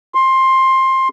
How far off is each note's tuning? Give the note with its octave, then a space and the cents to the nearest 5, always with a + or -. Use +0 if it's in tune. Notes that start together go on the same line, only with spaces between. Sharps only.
C6 +15